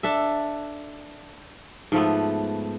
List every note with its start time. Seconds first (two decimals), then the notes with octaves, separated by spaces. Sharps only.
0.03 D4 A4 E5
1.92 G#2 F3 A3 B3